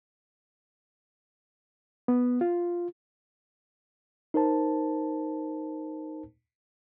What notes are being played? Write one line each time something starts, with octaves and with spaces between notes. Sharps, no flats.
B3
F4
D#4 A#4 C5 A5